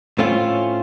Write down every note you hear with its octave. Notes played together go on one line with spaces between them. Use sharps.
A2 A3 C4 C#4 F4